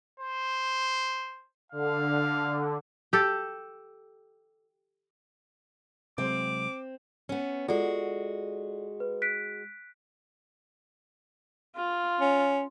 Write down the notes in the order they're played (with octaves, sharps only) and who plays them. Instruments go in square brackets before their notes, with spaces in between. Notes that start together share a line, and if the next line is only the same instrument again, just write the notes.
[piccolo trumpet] C5
[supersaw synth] D3 [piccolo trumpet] F5
[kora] G4 A4
[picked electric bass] C3 F#3 G#3 [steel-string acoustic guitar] C4 [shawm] D6
[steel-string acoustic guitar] B3 C#4
[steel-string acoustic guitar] G#3 F#4 [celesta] F4 A4 D5
[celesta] B4
F#6 B6 D7
[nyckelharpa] F4
[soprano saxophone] C#4